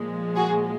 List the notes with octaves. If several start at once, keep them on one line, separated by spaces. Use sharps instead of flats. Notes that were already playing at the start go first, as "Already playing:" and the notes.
Already playing: A#2 F3 G#3
F#4 G#4